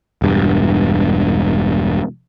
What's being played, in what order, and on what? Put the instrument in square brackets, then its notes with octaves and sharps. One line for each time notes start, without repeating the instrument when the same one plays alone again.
[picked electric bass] E1 G2